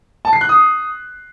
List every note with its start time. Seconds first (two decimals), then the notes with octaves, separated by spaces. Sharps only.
0.25 A5
0.33 C7
0.41 F#6
0.49 D#6